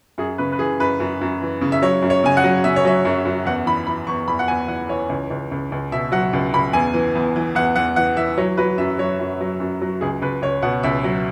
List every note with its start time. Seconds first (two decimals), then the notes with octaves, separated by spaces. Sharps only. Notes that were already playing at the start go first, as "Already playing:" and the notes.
0.18 F#2 G#4
0.38 C#3 B4
0.52 B4
0.59 E3 G#4
0.79 F#2 B4
1.00 F#2
1.21 F#2
1.42 E3
1.62 C#3
1.72 E5
1.82 F#3 C#5
2.02 F#2
2.10 C#5
2.24 C#3 G#5
2.37 F#5
2.44 F#3
2.64 C#3 E5
2.76 C#5
2.85 F#3 E5
3.05 F#2
3.25 F#2
3.45 E2 F#5
3.66 E3 B5
3.87 E3 B5
4.07 E2 C#6
4.27 E2 B5
4.39 F#5
4.48 E2 G#5
4.68 E3 F#5
4.89 E3 C#5
5.09 C#2
5.31 C#2
5.51 C#2
5.72 C#2
5.92 B2 E5
6.12 F#3 F#5
6.33 C#2
6.54 C#2 B5
6.73 E2 G#5
6.94 E3
7.15 E2
7.36 E3
7.55 E2 F#5
7.76 E2 F#5
7.96 E3 F#5
8.17 E3 E5
8.38 F#3 C#5
8.57 F#3 B4
8.78 F#2 E5
8.98 F#3 C#5
9.19 F#2
9.41 F#3
9.60 F#2
9.82 F#3
10.01 C#2 G#4
10.22 C#2 B4
10.42 C#2 C#5
10.62 B2 F#5
10.83 C#2 E5
11.04 F#3